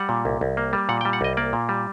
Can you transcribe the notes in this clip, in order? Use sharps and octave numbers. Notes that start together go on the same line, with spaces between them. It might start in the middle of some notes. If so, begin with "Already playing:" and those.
Already playing: G3 F#5
A#2
C2
C2
A#3
G3
A#2 F#5
G5
G3
F#5
C2 D#5
A#3 D5
A#2
G3